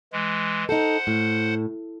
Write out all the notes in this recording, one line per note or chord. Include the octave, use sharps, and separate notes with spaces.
E3 G#3
D#4 A4 C5 F#5
A2